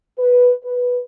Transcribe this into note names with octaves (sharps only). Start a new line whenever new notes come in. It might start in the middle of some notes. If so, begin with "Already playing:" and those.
B4
B4